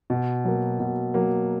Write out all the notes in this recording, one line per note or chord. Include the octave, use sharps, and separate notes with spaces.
B2
F#3 A#3
B2
F#3 A#3